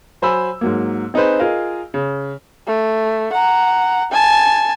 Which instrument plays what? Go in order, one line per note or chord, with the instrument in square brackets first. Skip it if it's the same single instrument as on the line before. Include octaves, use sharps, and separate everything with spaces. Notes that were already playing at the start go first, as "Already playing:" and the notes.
[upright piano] F#3 C5 G#5 B5 E6
G#2 F#3 A#3
C4 D#4 G#4 B4 C5
F4 G#4 A#4 D#5 F5
C#3
[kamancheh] A3
F#5 A#5
G#5 A5